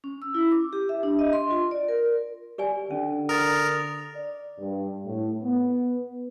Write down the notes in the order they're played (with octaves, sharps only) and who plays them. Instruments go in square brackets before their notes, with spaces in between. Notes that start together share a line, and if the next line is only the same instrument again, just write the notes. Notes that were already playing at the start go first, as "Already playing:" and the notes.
[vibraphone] C#4
E6
E4
D6
G4
E5
D4
D#5
C6
F4
D5
A#4
[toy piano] G4 D5 G#5
[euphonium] D3 [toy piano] C#4
[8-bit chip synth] A#4 [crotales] D#6 A6
[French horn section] D5
G2
A2
B3